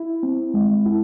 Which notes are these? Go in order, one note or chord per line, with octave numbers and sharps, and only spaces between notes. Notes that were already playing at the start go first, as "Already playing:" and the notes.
Already playing: E4
C4
G#3
E4